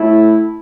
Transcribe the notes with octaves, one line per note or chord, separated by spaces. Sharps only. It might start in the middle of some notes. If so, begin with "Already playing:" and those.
Already playing: A2 A3 E4